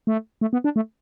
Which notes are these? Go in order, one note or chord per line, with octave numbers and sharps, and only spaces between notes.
A3
A3
B3
D4
A3